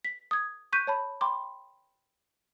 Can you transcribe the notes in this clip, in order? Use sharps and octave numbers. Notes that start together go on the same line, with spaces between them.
B6
D#6 G#6
C#6 F#6 G6 B6 D#7
C#5 A5 B5
G5 B5 C6 D6